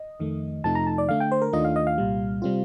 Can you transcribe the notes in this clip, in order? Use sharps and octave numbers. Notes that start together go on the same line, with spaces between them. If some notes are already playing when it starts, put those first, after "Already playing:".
Already playing: D#5
F2 D#3 A3
F2 C3 F3 A3 D#4 A5
A#5
A5
D5
D3 A3 D4 F5
G5
C5
A#4
D#2 D#3 A3 D4 F4 D#5
F5
D#5
F5
C2 A#2 G3
C3 G3 C4 F4